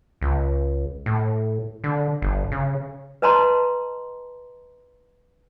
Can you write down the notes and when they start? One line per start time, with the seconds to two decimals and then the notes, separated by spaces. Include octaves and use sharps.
0.21 C#2
1.06 A2
1.84 D3
2.22 G1
2.52 C#3
3.22 B4 D#5 A5 A#5 C6